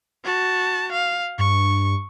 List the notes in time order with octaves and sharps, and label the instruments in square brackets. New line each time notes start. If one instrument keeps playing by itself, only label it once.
[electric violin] F#4 A5
F5
[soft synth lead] G2 [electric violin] C#6